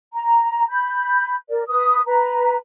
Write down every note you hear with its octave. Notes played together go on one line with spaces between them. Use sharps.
A#5
B5 G6
A#4 D5
B4 D#6
B4 A#5